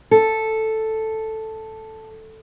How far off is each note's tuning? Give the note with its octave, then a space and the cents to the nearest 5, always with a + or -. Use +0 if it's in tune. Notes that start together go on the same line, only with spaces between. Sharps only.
A4 +0